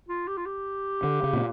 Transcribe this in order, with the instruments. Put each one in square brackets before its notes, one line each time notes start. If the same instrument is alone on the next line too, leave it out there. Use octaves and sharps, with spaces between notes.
[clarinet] F4
G4
F4
G4
[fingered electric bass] D3
C#3
A#2